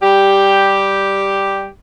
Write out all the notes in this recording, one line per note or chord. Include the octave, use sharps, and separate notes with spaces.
G3 G4